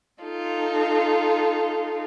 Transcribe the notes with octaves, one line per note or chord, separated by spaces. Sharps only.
D#4 F4 A4